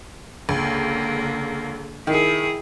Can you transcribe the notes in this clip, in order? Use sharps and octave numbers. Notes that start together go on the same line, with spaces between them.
C#2 D3 A#3
D#3 E4 G#4